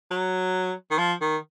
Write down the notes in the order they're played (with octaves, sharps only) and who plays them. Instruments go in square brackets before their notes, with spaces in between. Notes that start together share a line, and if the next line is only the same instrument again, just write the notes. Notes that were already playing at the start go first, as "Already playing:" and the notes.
[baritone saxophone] F#3
D#3
F3
D#3